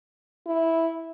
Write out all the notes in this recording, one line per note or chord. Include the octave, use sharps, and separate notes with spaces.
E4